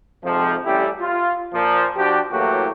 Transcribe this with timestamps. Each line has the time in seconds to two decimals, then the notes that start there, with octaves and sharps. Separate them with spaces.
0.24 F2 G#2 C3 F3
0.65 A1 G3 C#4 E4 G4
1.01 F4
1.53 A#2 F3
1.96 F3 D4 F#4 G4
2.32 A2 E3 F#3 A#3 F#4 G4